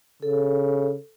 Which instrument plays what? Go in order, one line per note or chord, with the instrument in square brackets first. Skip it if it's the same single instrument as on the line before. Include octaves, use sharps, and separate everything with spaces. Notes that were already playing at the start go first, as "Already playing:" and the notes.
[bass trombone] C#3 [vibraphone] A4